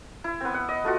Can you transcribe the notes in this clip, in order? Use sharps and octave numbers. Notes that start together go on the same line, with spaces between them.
E4
B3 C4
F#5
D#5
A3 F4 F#4